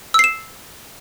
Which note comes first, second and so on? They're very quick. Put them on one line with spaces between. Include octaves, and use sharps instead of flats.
E6 C7 E7